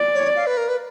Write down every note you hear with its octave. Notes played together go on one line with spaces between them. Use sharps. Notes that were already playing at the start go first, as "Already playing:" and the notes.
Already playing: D5
C#5
F5
B4
A#4
B4